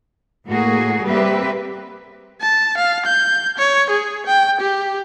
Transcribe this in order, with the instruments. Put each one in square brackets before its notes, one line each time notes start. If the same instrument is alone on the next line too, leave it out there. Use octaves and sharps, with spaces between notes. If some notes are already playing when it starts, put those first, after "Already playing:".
[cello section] A2 A#3 F#4 G#4
G3 A#3 C4 G4 B4 E5
[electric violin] A5
F5
G6
C#5
G#4
G5
G4